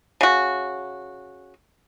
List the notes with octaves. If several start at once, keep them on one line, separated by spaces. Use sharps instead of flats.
C#3 F#4